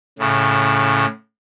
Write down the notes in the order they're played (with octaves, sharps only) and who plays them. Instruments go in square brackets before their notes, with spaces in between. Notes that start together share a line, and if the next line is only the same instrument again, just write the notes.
[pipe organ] A2 C#3